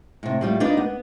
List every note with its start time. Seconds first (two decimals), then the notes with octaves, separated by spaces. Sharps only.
0.23 A2 C3
0.41 A2 G3 F4
0.60 B3 D4 D#4 F4 D5
0.77 B3